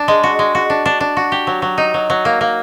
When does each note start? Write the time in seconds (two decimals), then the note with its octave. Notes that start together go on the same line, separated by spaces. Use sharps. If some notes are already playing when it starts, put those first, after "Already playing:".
Already playing: D4
0.08 G#3
0.23 F#4
0.39 G#3
0.55 F#4
0.70 D4
0.86 D4
1.00 D4
1.17 F#4
1.32 G4
1.47 F#3
1.62 F#3
1.78 D#4
1.94 F#3
2.10 F#3
2.25 A#3
2.41 A#3